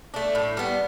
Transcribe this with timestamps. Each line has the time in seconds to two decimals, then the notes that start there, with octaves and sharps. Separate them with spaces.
0.14 A3 D4
0.35 A2
0.57 G3 B3